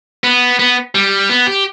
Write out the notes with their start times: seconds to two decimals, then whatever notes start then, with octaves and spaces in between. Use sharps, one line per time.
0.24 B3
0.59 B3
0.95 G3
1.30 B3
1.47 G4